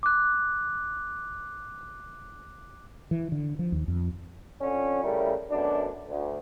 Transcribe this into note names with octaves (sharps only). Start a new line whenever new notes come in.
D6 F#6
E3
D3
F3
D#2
F2
F2 D3 C#4
C#3 G3 A3 E4 A#4
F#2 B2 A3 D4
D2